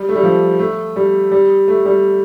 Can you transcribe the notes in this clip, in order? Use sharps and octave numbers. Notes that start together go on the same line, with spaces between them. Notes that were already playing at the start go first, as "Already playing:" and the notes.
Already playing: G3
A3
G3
F3
A3
G3
G3
A3
G3